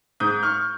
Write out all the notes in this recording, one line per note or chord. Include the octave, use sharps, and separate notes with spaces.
G#2 D#6 G6
C#6 F6